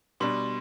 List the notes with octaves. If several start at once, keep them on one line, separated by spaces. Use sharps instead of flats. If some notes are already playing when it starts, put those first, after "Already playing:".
B2 G3 D4 C6